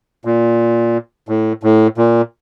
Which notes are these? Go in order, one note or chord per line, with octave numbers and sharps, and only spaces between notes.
A#2
A2
A2
A#2